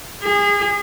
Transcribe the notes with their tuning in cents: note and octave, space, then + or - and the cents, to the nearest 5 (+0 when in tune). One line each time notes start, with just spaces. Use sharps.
G#4 -30